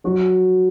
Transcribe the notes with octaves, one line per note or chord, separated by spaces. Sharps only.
F#3 F#4